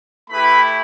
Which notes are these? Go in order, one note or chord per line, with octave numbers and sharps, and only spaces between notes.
A3 E4 G4 B4 B5